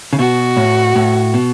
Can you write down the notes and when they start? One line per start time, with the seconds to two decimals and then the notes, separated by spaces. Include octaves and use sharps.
0.13 C#3
0.19 B2 F#4
0.57 A2
0.95 A2
1.34 B2